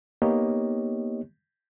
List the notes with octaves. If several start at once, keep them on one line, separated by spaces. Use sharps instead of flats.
A#3 B3 D#4 G4 C#5 D#5